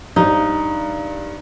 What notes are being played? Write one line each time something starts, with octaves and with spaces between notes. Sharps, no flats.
G2 D#4